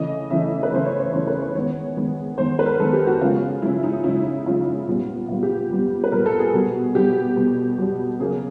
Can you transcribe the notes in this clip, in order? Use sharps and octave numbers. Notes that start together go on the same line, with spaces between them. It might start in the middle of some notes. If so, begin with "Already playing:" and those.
Already playing: C#3 E3 A3 D#5
C#3 E3 A3 E5
B4
C#3 E3 A3 C5
C#5
C#5
C#3 E3 A3 C5
B4
C#5
D#3 G#3 B3 C#5
D#3 G#3 B3
D#3 G#3 B3 C5
B4
A#4
D#3 G#3 B3 A4
G4
F#4
C#3 F3 G#3 F4
C#3 F3 G#3 E4
D#4
C#3 F3 G#3 E4
C#3 F3 G#3 F4
A#2 G3 B3
A#2 G3 B3 F4
G4
A#2 G3 B3
B4
A#2 G3 B3 A#4
A4
G#4
B2 G3 B3
B2 G3 B3 G4
B2 G3 B3
B2 G3 B3
C#3 F#3 A#3 G#4